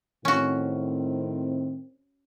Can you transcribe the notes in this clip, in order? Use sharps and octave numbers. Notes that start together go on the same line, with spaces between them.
A2 D#3 C4 C#4 F#4